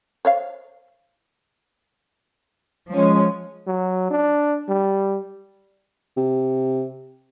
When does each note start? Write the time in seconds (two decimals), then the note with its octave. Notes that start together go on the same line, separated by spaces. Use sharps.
0.25 C5 C#5 F5
2.90 F3 G#3 C#4
3.67 F#3
4.11 D4
4.69 G3
6.17 C3